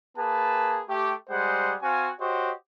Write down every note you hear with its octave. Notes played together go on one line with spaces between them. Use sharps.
A#3 G#4 B4 A5
A3 G4
G3 G#3 G#4 C5 F#5
C4 F#4 F5 G#5
F#4 G4 C5 C#5 D#5